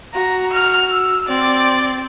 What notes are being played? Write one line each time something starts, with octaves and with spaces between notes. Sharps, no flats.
F#4 A#5
F6
E6
C4 D5